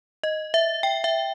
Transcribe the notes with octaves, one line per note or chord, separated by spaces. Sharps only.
D#5
E5
G5
E5